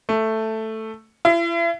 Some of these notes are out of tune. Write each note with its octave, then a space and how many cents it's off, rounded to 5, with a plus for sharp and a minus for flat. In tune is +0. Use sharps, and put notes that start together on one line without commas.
A3 +5
E4 +40